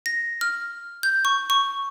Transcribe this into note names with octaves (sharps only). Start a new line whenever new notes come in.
A#6
F6
G6
C#6
C#6